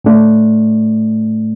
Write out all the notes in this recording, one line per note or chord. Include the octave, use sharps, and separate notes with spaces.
A2 A3 D4